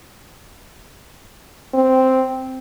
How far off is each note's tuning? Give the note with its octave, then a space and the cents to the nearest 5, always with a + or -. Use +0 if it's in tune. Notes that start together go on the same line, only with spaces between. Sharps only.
C4 -5